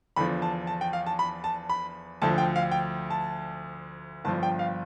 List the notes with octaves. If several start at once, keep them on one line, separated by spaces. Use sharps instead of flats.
E2 D3 F3 B5
A5
A5
G5
F5
A5
B5
A5
B5
D2 D3 F3 A5
G5
F5
G5
A5
G1 G2 F3 A5
G5
F5